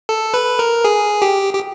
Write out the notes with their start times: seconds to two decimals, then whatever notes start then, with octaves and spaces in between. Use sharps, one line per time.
0.09 A4
0.34 B4
0.59 A#4
0.85 G#4
1.22 G4
1.54 G4